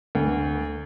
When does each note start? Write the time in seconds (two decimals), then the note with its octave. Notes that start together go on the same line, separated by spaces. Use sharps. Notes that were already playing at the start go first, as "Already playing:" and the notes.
0.15 D2